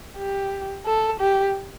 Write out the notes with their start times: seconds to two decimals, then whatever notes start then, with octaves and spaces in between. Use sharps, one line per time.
0.17 G4
0.86 A4
1.20 G4